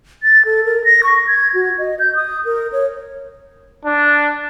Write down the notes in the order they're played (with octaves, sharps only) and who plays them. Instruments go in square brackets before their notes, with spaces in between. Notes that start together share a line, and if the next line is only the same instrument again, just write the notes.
[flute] A6
A4
A#4
A#6
C#6
G#6
F#4
D#5
G6
D#6
A#4
C#5
[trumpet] D4